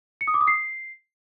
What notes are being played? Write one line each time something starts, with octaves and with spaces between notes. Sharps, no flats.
C#7
D#6
D6
D#6
C7